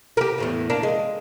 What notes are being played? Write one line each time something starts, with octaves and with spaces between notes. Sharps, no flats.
G4 A#4
E2 A2 E3
A#3 D4
G#3